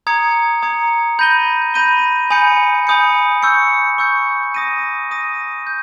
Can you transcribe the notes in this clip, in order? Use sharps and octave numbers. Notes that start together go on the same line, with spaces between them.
A#5 D#6 G#6 C#7
A#5 D#6 G#6 C#7
B5 G6 A#6 D#7 G7
B5 G6 A#6 D#7 G7
G#5 B5 D#6 G6 C#7
G#5 B5 D#6 G6 C#7
C#6 E6 G6 C#7
C#6 E6 G6 C#7
D#6 A#6 D#7
D#6 A#6 D#7
G6